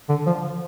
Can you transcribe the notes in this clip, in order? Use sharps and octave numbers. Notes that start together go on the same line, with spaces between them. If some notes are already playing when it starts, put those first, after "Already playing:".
D3
F3